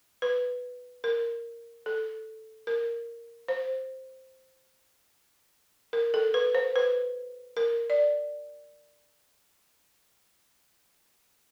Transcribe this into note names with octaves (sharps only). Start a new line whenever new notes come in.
B4
A#4
A4
A#4
C5
A#4
A4
B4
C5
B4
A#4
D5